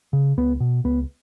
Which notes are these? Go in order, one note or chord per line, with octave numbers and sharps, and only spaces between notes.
C#3
C#2 B3
B2
C#2 B3